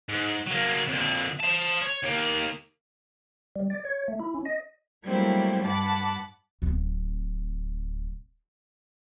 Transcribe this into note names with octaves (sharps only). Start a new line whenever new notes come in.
G#2
F#3 A#3
F2 D3
C5 A5
C#5
D#2 A#3
G3
D5
C#5
A3
E4
C#4
D#5
F#3 G3 A3 A#3 C4 E4
G2 F#5 A5 B5 D6
D1 C4